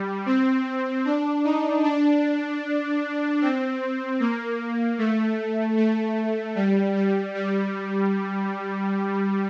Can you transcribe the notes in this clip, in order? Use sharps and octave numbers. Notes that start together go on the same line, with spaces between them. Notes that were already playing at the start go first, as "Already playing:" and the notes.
Already playing: G3
C4
D4
D#4
D4
C4
A#3
A3
A3
G3
G3
G3